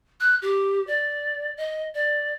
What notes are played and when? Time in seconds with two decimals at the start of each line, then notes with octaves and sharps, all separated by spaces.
0.20 F#6
0.42 G4
0.87 D5
1.57 D#5
1.94 D5